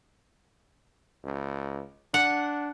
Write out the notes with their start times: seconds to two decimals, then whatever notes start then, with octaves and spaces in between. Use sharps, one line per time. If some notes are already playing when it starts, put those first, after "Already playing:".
1.24 C#2
2.14 D4 F#5